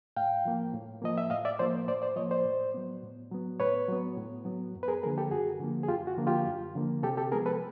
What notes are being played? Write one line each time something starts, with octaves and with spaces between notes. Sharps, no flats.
A2 F5 G5
F3 A#3
A2
F3 A#3 D#5
E5
A2 D#5 F5
D5 E5
F3 A#3 C5 D5
A2 C5 D5
C5 D5
F3 A#3 C#5 D#5
C5 D5
A2
F#3 B3
A2
F#3 B3
A2 B4 C#5
F#3 B3
A2
F#3 B3
F#2
B4
G#4 A#4
D3 F3 A#3 G#4 A#4
G4 A4
F#2 F#4 G#4
D3 F3 A#3
G#4
F#2 F4 G4
F#4
D3 F3 A#3
F4 G4
F#2
D3 F3 A#3
C3 G4 A4
G4 A4
F3 G#3 B3 G#4 A#4
A4 B4